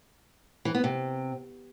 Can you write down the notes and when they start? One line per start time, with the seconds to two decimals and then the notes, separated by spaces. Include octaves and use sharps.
0.65 E3
0.75 B3
0.84 C3